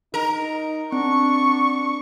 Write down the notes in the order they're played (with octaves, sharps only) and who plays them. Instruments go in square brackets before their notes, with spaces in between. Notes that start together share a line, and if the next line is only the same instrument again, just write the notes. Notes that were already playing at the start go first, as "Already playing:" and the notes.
[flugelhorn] D#4 [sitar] A#4
[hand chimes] C4 [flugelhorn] D4 [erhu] C#6